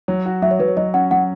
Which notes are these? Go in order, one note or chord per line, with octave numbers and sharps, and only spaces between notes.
F#3 C#5
F#4
F#3 E5
C#5
F#3 B4
C#5
F#3 D#5
C#4 F#5
F#3 F#5